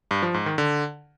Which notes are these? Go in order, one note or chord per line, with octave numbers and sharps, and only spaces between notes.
G2
F3
G#2
D#3
D3